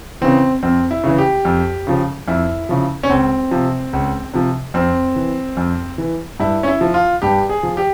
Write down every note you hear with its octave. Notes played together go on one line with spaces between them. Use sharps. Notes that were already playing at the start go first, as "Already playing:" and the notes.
C#3 E3 C4
F2 C4
E4
C#3 E3
G4
F2
C#3 F3
F2 E4
C#3 F3
C#4
C#2 C4
C3 F3
C#2
C3 F3
F2 C4
E3
F2
E3
G2 E4
C#4
E4
F3
F4
G2 G4
G#4
F3
G4